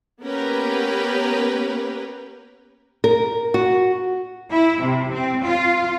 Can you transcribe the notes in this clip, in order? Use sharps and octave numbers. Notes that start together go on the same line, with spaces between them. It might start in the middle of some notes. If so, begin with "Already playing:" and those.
A#3 B3 C#4 G4 A#4 B4
A#4
F#4
E4
C3
C4
F4